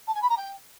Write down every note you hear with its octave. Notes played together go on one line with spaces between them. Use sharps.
A5
G#5
B5
A#5
G5